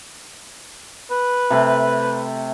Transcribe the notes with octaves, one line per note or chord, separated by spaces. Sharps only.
B4
C3 A3